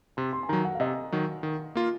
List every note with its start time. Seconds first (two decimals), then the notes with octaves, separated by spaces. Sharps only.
0.17 C3 C6
0.33 C6
0.43 G#5
0.49 D#3 F#3 A#5
0.65 F#5
0.75 F5
0.80 C3 D#5
1.12 D#3 F#3
1.43 D#3
1.75 A#3 F4